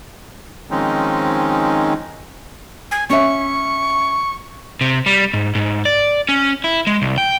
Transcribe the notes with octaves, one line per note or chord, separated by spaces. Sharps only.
D#3 F3 G#3 C4 C#4 D#4
G#5
C#4 E5 C#6
C3
G3
G#2
G#2
D5
C#4
E4
G#3
C2
G5